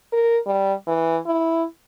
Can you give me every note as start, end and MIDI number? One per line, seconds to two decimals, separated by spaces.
0.12 0.38 70
0.46 0.74 55
0.87 1.18 52
1.26 1.64 64